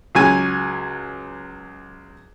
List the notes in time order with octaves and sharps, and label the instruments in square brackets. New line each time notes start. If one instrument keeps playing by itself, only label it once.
[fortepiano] C#2 F#3 G#5